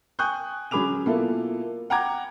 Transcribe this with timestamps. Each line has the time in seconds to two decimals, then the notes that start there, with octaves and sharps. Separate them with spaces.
0.19 G5 G#5 C#6 D#6 F#6 G6
0.71 F#3 C#4 G#4 B5 D6 F7
1.06 B2 A#3 E4 F4 A4
1.90 F#5 G5 A#5 D6 G#6